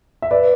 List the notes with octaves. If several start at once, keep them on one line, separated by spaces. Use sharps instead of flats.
E5
B4 D5